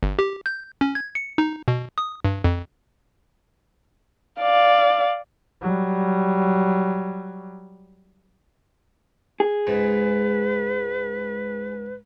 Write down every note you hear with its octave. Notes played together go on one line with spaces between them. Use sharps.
G1
G4
G6
C#4
G#6
C#7
D#4
B2
D#6
G2
F2
D5 F5
F#3 G3
G#4
C#2 G#2 B4